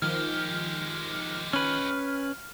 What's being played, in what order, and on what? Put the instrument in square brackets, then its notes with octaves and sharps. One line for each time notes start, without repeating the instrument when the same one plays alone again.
[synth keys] D#3 F3 [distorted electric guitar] G#3 G4 [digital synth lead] F6
[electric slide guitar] C#4 B4 [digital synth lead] F6